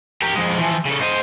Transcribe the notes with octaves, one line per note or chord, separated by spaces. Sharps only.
G4 A#4
F2 G#3
E3 F3
C#3 A4
C5 D#5